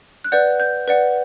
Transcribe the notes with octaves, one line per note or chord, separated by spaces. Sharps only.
F#6
B4 D5 F#5 G6
G6
B4 D5 F#5